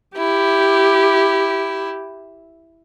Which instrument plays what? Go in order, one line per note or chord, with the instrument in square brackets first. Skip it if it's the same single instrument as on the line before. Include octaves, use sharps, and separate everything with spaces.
[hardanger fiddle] E4 [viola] G4